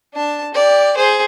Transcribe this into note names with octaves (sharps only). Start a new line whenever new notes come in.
D4 A5
G4 D5
G#4 C5